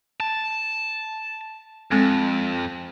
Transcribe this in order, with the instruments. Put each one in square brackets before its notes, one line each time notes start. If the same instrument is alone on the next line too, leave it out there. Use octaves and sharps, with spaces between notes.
[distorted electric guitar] A5
[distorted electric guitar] F2 [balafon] G#3 C4 A4